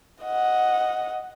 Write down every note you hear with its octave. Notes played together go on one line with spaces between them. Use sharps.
D#5 F#5